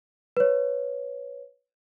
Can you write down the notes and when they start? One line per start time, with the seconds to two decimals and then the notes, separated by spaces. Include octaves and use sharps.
0.37 B4 C#5